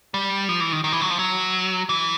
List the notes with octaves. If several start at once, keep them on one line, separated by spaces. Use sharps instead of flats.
G3
F3
E3
D#3
D#3
E3
F#3
F3
F#3
E3